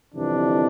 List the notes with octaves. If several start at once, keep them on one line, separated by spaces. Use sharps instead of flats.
G1 F2 C3 E3 D4